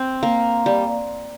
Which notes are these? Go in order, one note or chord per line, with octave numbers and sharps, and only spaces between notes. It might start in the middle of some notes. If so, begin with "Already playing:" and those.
Already playing: C4
A#3
G3